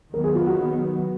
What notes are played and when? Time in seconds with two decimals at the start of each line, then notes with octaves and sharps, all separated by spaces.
0.13 D#3 F#3 B3 A#4
0.24 G#4
0.35 F4
0.46 F#4